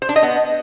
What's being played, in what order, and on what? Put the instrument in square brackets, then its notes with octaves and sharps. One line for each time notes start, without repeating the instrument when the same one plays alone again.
[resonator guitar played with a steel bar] C5
D4
D#5
B3